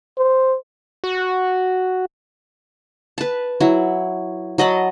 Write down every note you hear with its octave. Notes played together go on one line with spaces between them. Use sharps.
C5
F#4
B4 A5
F#3 E4
F#3 D#5 A5 B5